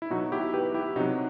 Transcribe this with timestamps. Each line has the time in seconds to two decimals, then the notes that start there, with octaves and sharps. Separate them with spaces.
0.02 E4
0.10 B2 F#3 D#4 F#4
0.32 E4 G4
0.54 G4 B4
0.74 E4 G4
0.96 C3 D#4 F#4
1.00 F#3